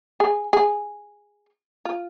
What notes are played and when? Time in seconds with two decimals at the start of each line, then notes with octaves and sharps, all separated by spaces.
0.20 G#4
0.53 G#4
1.85 F4